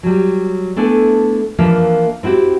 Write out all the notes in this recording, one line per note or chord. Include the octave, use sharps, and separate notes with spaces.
F#3 G3
A3 B3 D4 E4 A4 G#5
E3 F3 A#3 D4 A#4 E5
C4 E4 F#4 G4